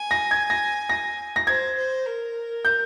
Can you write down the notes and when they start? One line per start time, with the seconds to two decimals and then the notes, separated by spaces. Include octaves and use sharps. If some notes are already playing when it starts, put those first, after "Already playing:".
Already playing: G#5
0.11 A#6
0.31 G#6
0.50 A#6
0.89 A#6
1.36 A#6
1.47 C5 G#6
1.78 C5
2.07 A#4
2.65 G6